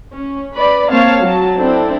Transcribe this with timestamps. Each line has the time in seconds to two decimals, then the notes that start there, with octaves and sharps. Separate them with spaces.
0.15 C#4
0.54 B4 D5 B5
0.91 A#3 C4 C#5 F5 A5
1.21 F#3 A5
1.58 C4 D4 E4 A4